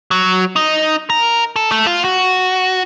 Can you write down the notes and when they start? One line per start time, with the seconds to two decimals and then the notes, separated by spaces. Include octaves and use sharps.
0.11 F#3
0.56 D#4
1.10 A#4
1.56 A4
1.71 A3
1.87 F4
2.04 F#4